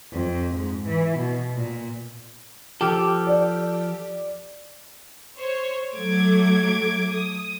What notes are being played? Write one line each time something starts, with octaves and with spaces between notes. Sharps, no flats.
F2
G#2
E3
B2
A#2
F3 G4 A4
D5
C5 C#5
F#3 A3 D6 G#6
D#6